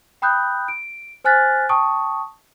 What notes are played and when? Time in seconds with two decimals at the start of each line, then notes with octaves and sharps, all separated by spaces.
0.22 G5 B5 D#6 F#6 G6
0.68 D7
1.24 C5 G#5 F6 F#6 A6 B6
1.69 G5 A5 C#6 D#6